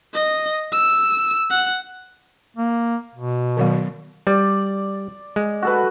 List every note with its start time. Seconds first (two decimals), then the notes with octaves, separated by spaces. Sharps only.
0.14 D#5
0.72 E6
1.50 F#5
2.57 A#3
3.15 B2
3.57 D#3 F#3 B3
4.27 G3 D5
5.36 G#3
5.62 F#4 A4 B4